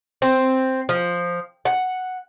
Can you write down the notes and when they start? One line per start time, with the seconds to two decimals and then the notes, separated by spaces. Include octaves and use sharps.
0.22 C4
0.89 F3
1.65 F#5